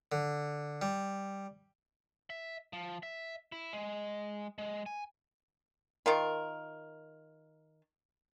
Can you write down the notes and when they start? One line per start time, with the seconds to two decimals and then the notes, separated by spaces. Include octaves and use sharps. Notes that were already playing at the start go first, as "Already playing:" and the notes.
0.12 D3
0.82 G3
2.30 E5
2.73 F3
3.03 E5
3.52 E4
3.73 G#3
4.58 G#3
4.86 G#5
6.06 D#3 F4 A#4